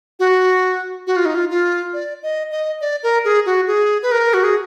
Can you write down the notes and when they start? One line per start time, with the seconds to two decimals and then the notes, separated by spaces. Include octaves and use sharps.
0.19 F#4
1.07 F#4
1.16 F4
1.25 D#4
1.35 F4
1.50 F4
1.93 D5
2.23 D#5
2.51 D#5
2.81 D5
3.03 A#4
3.25 G#4
3.46 F#4
3.67 G#4
4.03 B4
4.12 A#4
4.34 F#4
4.44 G#4